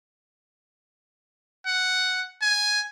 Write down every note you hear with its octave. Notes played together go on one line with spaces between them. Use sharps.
F#5
G#5